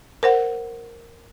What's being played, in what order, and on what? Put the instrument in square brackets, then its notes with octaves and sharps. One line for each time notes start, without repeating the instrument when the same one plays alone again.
[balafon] A#4 C5 F#5